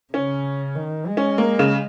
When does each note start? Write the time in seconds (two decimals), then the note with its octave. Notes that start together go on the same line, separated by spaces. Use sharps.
0.13 C#3 C#4
0.75 D#3
1.07 G#3
1.17 C#4
1.38 A#3
1.59 C#3